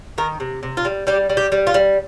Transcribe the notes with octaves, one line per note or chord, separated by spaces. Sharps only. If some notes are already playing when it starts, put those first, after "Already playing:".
D#3 A#4
C3
C3
F4
G3
G3 G4
G3
G4
G3
F4
G3